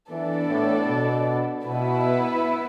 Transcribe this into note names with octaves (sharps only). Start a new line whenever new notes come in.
E3 B3 D4 A4 D5
A2
B2
B2 B3 E4 B4